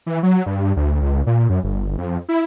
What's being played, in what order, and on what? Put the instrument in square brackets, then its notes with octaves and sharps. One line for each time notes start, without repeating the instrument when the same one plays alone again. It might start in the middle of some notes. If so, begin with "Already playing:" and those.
[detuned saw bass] E3
F#3
G2
D2
C#2
A#2
F#2
G1
F2
E4